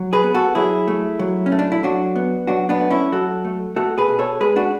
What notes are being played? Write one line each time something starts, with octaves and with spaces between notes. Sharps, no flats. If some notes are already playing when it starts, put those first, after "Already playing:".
Already playing: F#3
G#4 B4
B3
F#4 A4
F#3 E4 G#4
A3
F#3
C#4
A3
D4
E4
F#3 D4 F#4
B3
F#3 D4 F#4
B3 D4
A3
C#4 E4
F#3 F#4 A4
A3
A3 F#4 A4
G#4 B4
B2
A4 C#5
G#3 G#4 B4
D4 F#4